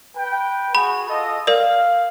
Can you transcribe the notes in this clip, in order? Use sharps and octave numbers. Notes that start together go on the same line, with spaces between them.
B4 G5
F#4 G#4 B5
F4 A4 D#5
A#4 D5 F5